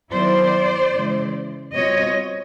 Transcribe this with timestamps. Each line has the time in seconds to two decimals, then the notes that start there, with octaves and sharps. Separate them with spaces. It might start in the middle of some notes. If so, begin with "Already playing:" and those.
0.12 D#3 F#3 B3 E4 C5 D5
0.93 C#3 E3 G#3
1.74 B2 G3 C4 F4 C#5 D#5